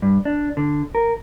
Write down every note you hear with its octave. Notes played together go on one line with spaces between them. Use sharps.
G2
D4
D3
A#4